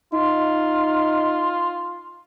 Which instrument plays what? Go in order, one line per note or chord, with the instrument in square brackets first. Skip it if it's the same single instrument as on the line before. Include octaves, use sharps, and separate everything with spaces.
[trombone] D#4 [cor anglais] F4